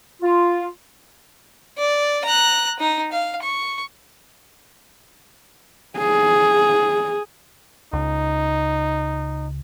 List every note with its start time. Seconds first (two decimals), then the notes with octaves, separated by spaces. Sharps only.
0.22 F4
1.78 D5
2.25 A#5 F#6
2.79 D#4 A#5
3.12 F5
3.43 C#6
5.98 G#4
7.93 C#2 D#4